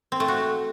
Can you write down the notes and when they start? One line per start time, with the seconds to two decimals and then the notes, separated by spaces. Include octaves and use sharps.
0.12 C4
0.20 A3
0.28 F#4